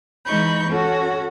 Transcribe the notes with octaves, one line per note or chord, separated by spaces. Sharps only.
E3 G#3 D#4 B5 C#6 G6
C#4 F#4 A4